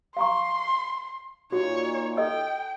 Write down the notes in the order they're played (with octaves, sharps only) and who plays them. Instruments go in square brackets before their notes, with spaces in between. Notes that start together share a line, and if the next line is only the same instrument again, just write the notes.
[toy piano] F5 A#5 C#6 [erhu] C6
[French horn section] A#2 D#4 F4 [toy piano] F#4 [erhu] C#5
[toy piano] A4 D#5 E6 [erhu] G5